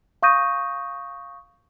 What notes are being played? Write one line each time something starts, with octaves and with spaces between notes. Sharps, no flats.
F5 C#6 D#6 G6 A#6 D#7